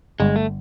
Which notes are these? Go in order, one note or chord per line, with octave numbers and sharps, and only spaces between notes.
G1 G#3
A3